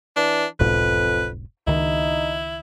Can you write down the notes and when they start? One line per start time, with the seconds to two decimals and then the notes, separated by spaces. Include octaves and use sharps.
0.16 E3 D4
0.60 E1 B1 F2 G#2 B4
1.67 C#2 D#3 D#4 E4